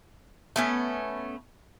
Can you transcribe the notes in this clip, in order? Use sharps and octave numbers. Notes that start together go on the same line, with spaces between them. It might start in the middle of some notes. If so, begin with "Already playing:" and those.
A3 B3 C#4